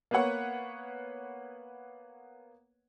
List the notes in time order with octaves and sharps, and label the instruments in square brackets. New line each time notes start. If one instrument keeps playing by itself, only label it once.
[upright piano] A#3 B3 B4 C#5 F#5